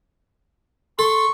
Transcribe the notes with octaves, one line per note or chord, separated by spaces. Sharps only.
A4 C6 C#6